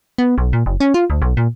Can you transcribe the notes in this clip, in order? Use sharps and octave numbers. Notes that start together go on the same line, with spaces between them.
B3
B1
A#2
F#1
C#4
F4
D2
B1
A#2